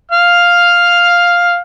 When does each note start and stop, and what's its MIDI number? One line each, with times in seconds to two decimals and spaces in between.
0.12 1.58 77
0.12 1.58 89